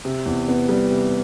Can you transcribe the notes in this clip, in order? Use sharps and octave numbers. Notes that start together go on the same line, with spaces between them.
C3
E2
B3
G3
C3